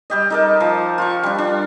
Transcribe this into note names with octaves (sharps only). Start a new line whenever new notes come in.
G3 G4 D#5
D#4 A4 A#4
F3
F4 C#6
G3 D4
D4